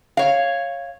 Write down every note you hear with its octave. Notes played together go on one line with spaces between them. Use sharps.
C#5 F5